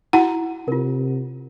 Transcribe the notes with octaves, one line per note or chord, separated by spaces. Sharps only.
E4 F#4 F#5 A#5
C3 F4 A#4